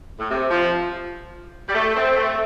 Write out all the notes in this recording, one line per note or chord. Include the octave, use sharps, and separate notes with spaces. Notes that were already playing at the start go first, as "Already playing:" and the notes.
A2
C3
F3
G3
A3
C4
A3